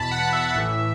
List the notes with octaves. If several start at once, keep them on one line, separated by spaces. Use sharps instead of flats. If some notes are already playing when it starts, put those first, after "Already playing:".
Already playing: E2 B2 A5 B5
F#5
E5
A1 A2 E3